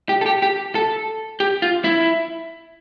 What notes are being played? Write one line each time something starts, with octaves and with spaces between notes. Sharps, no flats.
G4
A4
G4
G4
A4
G4
F4
E4